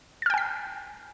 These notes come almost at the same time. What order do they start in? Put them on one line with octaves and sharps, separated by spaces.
A6 F6 G5 G#5 B6